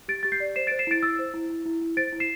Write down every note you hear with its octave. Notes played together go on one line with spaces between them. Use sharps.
G4 A6 D7
G4 A6
G6 C7
D5
C5 C7 E7
A6 D7
C5
C7 E7
E4 A6 D7
E4 E6 A6
C5
E4
E4
E4
E4
C5 A6 D7
E4
C7 E7